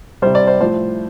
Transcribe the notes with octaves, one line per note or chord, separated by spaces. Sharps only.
C3 G3 C5
D5
C5
A2 F3 C5